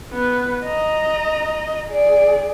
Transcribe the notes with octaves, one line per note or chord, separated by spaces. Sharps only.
B3 B4
D#5 A#5
G#4 D5